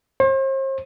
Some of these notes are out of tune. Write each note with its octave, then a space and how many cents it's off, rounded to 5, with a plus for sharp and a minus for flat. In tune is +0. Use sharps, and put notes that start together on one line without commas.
C5 +40